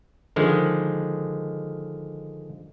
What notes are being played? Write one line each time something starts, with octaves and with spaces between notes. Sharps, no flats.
D3 D#3 F3 G#3